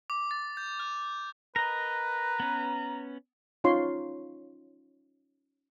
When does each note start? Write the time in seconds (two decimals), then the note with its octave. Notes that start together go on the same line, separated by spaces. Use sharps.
0.10 D6
0.31 A6
0.57 G6
0.80 F6
1.56 A#4 B4 D#5 A#5
2.40 B3 C#4
3.64 C#4 D#4 F4 C#5 C6